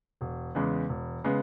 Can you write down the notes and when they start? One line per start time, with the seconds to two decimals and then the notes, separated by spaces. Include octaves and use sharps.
0.21 E1
0.55 E2 C#3 G#3 B3
0.89 E1
1.24 C#3 G#3 B3